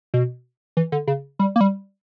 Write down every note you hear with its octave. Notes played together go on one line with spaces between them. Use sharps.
B2
E3
D3
C#3
G3
A#3
G3